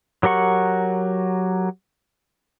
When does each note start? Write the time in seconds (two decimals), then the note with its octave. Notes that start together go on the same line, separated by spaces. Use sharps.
0.23 F#3 G4 A#4 F#5 C#6